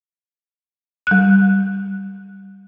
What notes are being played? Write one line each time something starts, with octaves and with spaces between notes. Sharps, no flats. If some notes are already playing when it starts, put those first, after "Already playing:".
G3 F#6